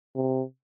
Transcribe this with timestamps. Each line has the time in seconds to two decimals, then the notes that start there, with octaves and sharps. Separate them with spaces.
0.15 C3